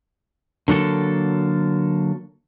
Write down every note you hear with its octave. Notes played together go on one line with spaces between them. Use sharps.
D3 F#3 A#3 A4